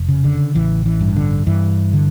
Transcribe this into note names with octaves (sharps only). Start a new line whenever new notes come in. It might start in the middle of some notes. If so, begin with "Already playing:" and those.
Already playing: F1
C#3
D3
A1 E3
E3
G2
D3
G2 E3
D3